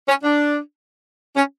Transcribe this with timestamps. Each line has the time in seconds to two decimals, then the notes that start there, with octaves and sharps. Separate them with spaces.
0.09 C#4
0.24 D4
1.37 C#4